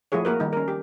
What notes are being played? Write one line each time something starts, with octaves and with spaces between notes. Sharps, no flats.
F3 A3 E4 G#4 C#5
A#3 F#4 A#4 B4
D#3 G3 D#4
C#4 A#4
G4